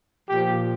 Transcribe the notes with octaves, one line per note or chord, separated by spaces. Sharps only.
A#2 F3 G4